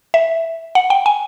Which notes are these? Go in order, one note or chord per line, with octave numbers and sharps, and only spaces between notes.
E5
F#5
G5
G#5